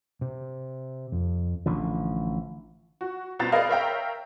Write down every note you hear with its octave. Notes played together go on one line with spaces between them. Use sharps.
C3
F2
A1 D3 F3
F#4
C2 B2 C4 A#5 A6
G#4 A#4 B4 D5 D#5 F5
A#4 C#5 E5 F5 G5 A#5